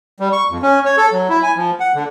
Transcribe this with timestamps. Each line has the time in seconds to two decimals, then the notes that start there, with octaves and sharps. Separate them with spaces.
0.20 G3
0.33 C#6
0.50 F2
0.62 C#4
0.86 C#5
0.97 A4
1.12 F#3
1.29 E4
1.43 G#5
1.56 F3
1.80 F#5
1.95 D3